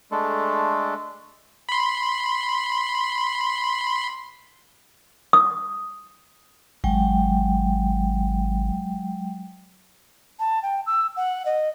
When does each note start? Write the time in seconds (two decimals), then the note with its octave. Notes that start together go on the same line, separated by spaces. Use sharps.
0.11 G#3 A3 D4 A4
1.69 B5 C6
5.33 D#6
6.84 G#1 F#3 G#3 G5
10.40 A5
10.63 G5
10.87 E6
11.17 F#5
11.46 D#5